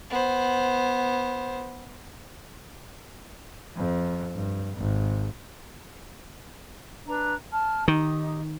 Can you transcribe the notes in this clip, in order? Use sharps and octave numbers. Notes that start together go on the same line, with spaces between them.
B3 C5
F2
G2
G#1
D4 B4 A#5
A5 F6
D#3 D#4 G4 D#6